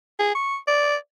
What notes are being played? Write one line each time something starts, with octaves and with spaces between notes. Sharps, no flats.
G#4
C#6
D5